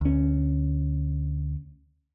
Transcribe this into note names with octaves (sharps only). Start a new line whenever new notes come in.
D2 C#4